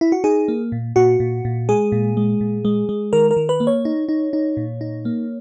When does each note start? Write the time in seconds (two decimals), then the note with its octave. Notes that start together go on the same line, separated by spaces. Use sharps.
0.01 E4
0.12 F#4
0.24 D#4 G#4
0.48 A#3
0.72 A#2
0.96 A#2 F#4
1.20 A#2
1.45 A#2
1.69 G#3 G#4
1.92 A#2
2.17 G#3
2.41 A#2
2.65 G#3
2.89 G#3
3.13 D#3 A#4
3.31 A#4
3.37 D#3
3.49 B4
3.60 A#3
3.67 C#5
3.85 D#4
4.09 D#4
4.33 D#4
4.57 A#2
4.81 D#4
5.05 A#3